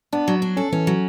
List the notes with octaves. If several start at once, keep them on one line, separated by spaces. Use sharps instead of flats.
B3 D4
F#3
D4
C#4 A4
E3 C#4
F#3